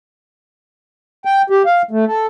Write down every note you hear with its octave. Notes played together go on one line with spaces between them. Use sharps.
G5
G4
F5
A3
A4